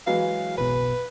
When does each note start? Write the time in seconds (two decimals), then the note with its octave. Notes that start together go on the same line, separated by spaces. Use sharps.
0.07 E3 F#3 G#3 F5
0.58 F#1 B1 B2 B4